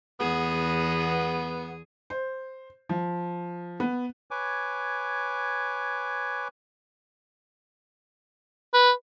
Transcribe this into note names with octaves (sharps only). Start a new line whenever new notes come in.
E2 B3 G#4
C5
F3
B3
B4 C#5 G#5 D6
B4